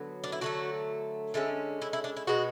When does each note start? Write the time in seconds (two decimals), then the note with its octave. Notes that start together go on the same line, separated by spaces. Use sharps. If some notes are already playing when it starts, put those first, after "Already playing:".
Already playing: D3 F#3 B3
0.24 D4
0.32 E4
0.41 D3 F#3 A3 F#4
1.34 D3 G#3 C#4 E4
1.82 E4
1.93 E4
2.04 D4
2.17 E4
2.27 B2 G#3 B3 F#4